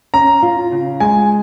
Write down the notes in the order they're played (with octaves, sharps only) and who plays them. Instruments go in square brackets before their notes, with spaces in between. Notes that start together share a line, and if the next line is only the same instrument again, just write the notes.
[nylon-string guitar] C#4 [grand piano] A#5
[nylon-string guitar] F4
C#3
[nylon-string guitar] G#3 [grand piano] G#5